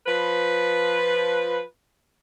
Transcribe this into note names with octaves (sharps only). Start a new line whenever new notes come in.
F3 B4